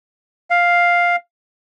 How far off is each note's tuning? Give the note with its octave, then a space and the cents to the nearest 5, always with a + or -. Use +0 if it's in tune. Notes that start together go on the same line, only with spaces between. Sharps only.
F5 +5